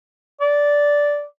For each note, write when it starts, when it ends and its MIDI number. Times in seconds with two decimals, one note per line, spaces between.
0.41 1.24 74